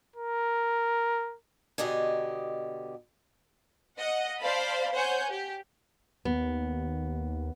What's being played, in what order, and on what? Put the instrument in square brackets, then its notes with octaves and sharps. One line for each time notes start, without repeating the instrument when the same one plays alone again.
[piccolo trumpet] A#4
[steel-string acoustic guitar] B2 D3 G4 D#5 G#5
[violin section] D#5 F#5
C5 D5 F5 A5 B5
C5 C#5 F#5 G#5 G6
G4
[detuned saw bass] D#2 [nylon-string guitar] B3